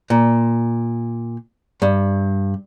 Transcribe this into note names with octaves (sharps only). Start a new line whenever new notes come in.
A#2
G2